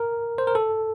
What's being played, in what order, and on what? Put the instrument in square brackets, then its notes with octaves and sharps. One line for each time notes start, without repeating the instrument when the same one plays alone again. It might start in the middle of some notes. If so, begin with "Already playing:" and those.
Already playing: [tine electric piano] A#4
C5
A#4
A4